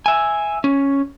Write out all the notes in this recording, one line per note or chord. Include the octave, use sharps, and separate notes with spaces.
E5 G#5
C#4